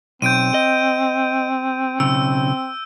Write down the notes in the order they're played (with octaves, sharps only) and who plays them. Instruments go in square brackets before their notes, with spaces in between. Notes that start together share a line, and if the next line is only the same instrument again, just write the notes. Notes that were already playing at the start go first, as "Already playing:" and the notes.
[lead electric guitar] B1 [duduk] C4 [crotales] G6 D7 D#7
[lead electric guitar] D#5
[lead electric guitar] B1 C#3 [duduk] C4 [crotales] E6